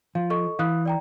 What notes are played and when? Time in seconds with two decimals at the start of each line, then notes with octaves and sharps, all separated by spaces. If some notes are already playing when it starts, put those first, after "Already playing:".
0.15 F3 F5
0.30 A4 D#5 C#6
0.59 E3 F5 D#6 F#6
0.86 D5 G5 A#5